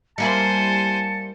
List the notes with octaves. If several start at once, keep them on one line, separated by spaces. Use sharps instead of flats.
G3 A#3 E4 C5 G#5 A5 C#7